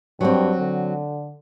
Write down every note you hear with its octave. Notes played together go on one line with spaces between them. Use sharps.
G2 F#3 C4
D3